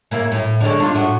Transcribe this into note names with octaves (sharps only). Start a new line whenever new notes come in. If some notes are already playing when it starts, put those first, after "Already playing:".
C#3 A#3 E4
A2
D3 G#3 C#4
D4 F4
A2 F#4